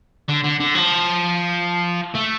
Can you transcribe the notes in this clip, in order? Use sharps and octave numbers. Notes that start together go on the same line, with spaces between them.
D3
D3
D3
F3
A3